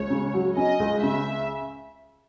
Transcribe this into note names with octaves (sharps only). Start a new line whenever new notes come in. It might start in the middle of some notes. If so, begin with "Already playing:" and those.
Already playing: C#2 C#5
C#3
F#3
C#4 D#5
C#2
C#3 E5